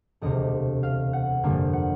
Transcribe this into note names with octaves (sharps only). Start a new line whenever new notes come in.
E1 D2 C3 D#5
F5
F#5
G1 F2 D3 G3 A#3
F#5